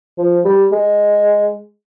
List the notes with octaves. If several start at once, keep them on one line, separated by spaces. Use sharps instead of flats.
F3
G3
G#3